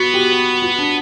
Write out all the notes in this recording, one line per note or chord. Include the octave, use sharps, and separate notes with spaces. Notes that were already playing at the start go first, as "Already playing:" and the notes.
Already playing: B3 F#4
G4
F#4
D4